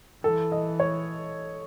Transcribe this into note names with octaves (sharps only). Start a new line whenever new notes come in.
E3 A4
D#5
C#5